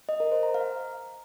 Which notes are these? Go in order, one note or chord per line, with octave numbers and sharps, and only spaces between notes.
D#5
A#4
C5
A#5
F5